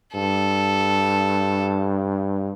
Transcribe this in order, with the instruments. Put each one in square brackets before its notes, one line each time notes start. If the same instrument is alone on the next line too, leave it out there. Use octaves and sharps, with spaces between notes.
[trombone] G2 [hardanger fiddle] A4